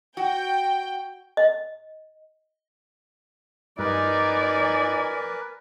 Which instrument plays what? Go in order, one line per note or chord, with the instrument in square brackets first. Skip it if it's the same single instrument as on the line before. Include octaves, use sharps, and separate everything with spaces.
[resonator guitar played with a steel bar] F#4 [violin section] G5
[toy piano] D#5
[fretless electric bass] G2 [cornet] D#4 [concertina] A#4 B4 [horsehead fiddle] D5 G#5